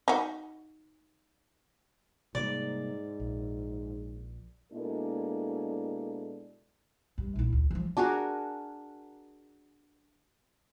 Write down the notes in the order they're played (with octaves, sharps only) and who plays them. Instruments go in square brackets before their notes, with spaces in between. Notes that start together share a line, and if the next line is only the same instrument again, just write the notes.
[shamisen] D#4 F#4
[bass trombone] G#2 [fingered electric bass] C3 G3 A#3 [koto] D5
[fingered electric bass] A#1
[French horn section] B2 G#3 A#3 D4 E4 A4
[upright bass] G2
A#1 E4
D2
E3 F3
[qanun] D4 F#4 G#4 A#4